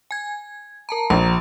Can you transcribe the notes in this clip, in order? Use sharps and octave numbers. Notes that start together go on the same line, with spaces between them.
G#5 G#6
A#4 A5 A#5
A#1 A#5